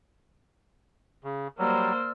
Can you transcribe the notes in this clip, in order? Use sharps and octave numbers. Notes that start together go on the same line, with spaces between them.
C#3
F#3 G3 A#3 C5 D5 E6 F6